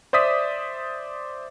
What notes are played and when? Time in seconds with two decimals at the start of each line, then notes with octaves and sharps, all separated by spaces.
0.13 C5 D5 E5 D#6 B6